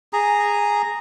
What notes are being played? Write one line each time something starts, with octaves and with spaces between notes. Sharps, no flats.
G#4 A#5